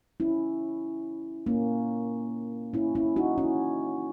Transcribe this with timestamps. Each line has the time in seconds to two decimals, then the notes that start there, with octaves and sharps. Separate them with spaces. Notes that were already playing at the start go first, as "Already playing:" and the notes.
0.20 C#4 E4
1.46 A#3 C#4
2.74 C#4 E4
2.95 C#4 E4
3.16 D#4 F#4
3.38 C#4 E4